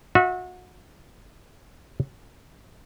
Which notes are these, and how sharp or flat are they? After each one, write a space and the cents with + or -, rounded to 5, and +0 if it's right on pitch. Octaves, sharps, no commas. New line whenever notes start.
F#4 -30 E5 -25